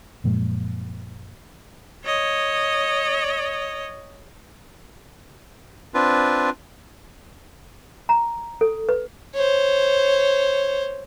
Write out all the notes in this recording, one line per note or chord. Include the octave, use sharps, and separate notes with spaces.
F#2 A#2 F3 G#3
C#5 D#5
C4 D4 F4 B4
A#5
A4
B4
C5 C#5